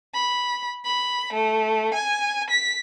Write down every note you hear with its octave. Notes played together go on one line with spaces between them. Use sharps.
B5
B5
A3
G#5
B6